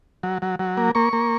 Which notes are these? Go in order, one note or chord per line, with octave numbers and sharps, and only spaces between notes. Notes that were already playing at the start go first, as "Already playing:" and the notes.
F#3
F#3
F#3
A#3
A#3 C#6
A#3